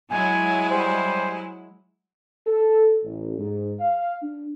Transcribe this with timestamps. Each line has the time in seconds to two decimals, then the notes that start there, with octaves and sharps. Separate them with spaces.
0.10 F#3 G#3 E4 G#5
0.71 G3 C5 G#5
2.47 A4
3.04 A1
3.38 G#2
3.80 F5
4.22 D4